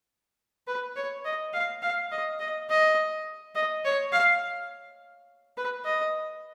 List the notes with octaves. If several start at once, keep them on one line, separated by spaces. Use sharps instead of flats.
B4
C#5
D#5
F5
F5
D#5
D#5
D#5
D#5
C#5
F5
B4
D#5